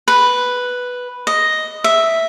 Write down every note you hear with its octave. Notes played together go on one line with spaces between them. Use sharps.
B4
D#5
E5